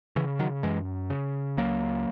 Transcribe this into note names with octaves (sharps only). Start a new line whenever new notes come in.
C#3 E3
D#3 F#3
F#2 E3 G#3
C#3
C#2 F#3 A#3